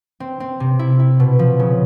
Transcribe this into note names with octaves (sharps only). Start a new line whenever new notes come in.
C4
C4
C3
E4
E4
B2
F3
C#3